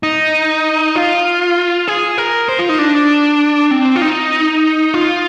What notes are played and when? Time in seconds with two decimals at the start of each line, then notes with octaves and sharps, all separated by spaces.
0.03 D#4
0.96 F4
1.88 G#4
2.18 A#4
2.49 C5
2.59 F4
2.69 D#4
2.79 D4
3.71 C4
3.96 F4
4.01 D#4
4.94 F4